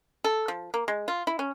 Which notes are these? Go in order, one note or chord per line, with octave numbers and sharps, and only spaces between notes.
A4
F3
A#3
G#3
F4
E4
C#4